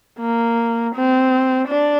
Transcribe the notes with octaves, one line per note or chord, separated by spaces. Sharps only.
A#3
C4
D4